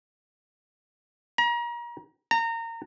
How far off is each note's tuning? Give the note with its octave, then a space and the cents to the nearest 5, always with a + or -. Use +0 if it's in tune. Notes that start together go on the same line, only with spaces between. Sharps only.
A#5 +35
A#5 -25